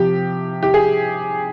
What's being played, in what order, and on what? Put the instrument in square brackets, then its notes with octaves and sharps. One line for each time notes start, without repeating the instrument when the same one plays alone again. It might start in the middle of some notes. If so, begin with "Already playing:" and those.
Already playing: [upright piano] C3 F3 G4
G4
G#4